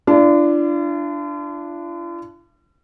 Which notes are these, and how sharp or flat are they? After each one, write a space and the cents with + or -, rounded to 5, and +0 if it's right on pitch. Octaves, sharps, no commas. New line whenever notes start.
D4 +0 F4 -45